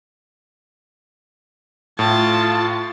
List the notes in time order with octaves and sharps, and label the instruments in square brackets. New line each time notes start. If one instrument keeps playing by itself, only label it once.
[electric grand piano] A2 [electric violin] F4 A5